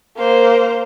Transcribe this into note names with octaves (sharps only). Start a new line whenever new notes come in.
A#3 C5